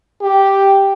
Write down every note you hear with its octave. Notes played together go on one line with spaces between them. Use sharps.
G4